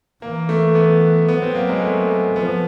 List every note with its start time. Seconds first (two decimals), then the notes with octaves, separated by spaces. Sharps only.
0.22 E3 A#3
0.49 A3
0.75 B3
1.28 F#3 B3
1.42 C4
1.56 A#3
1.69 G#3
1.83 A3
2.36 F3 B3